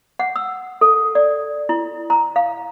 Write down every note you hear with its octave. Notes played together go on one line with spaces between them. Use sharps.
F#5
E6
A4
D5
E4
A#5
F5